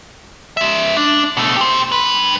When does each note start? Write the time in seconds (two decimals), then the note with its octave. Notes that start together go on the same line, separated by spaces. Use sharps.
0.57 G#3 E5
0.97 D4
1.37 B2 A3
1.57 G4 C5
1.92 G2 B4